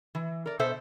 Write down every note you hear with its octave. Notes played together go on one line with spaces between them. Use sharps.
E3
A#4 D5
B2 A4 C5 E5